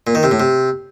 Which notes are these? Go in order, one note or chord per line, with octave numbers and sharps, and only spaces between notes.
A#2
D#3
C3
A2
C3